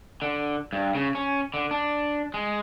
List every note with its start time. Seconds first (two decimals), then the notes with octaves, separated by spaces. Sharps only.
0.22 D3
0.73 G2
0.95 C#3
1.15 C#4
1.54 D3
1.71 D4
2.34 G#3